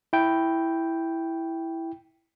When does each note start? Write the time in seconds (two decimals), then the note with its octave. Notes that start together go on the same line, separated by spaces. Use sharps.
0.13 E4 G5